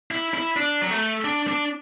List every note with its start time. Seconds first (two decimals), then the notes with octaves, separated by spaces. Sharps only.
0.11 E4
0.34 E4
0.57 D4
0.82 F#3
0.91 A3
1.24 D4
1.48 D4